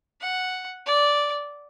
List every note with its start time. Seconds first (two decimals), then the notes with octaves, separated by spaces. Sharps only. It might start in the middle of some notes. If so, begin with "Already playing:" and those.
0.21 F#5
0.86 D5